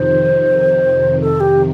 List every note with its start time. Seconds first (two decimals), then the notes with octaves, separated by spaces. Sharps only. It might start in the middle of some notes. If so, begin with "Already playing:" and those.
Already playing: F2 C3 D#3 C5
1.21 A4
1.40 G4